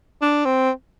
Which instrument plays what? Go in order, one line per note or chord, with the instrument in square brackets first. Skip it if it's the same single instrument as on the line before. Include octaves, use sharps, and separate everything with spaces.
[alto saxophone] D4
C4